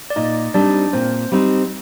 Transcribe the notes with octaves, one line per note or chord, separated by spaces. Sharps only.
D5
A#2 D#4 D#5
G3 C4 D4 D#4 D5
A#2 C4 C5
G3 C4 D#4